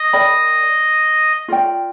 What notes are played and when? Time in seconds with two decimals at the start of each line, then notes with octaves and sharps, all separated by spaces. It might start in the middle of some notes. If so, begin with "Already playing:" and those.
Already playing: D#5
0.13 A#4 D5 G5 B5
1.48 F4 A#4 D5 G5